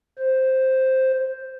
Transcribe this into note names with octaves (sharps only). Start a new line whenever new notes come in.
C5